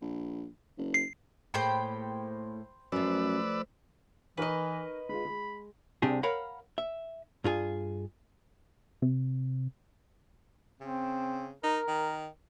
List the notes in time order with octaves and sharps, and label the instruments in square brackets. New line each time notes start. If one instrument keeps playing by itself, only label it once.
[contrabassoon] A#1
F#1
[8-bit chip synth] C7
[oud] A2 A#3 G#4 [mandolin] C5 G5 B5
[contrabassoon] F#2 [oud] F3 A3 [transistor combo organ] B4 D5 E6
[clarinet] E3 [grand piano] D#4 A#4 C#6 [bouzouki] B4 D#5
[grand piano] G#3 F4 [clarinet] B5
[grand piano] G#3
[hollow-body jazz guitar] C2 C3 C4 D4 G4 G#4
A#4 C#5 F5 F#5 B5
E5
G2 F4 G#4
[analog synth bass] C3
[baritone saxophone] C#3 [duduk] C4
[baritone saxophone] D#4 [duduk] A#4
[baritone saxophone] D#3